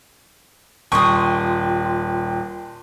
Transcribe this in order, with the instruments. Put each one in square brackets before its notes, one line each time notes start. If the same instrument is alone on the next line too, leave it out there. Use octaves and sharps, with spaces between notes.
[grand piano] D#1 [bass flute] F4 [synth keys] G5 C6 [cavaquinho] C#6 D#6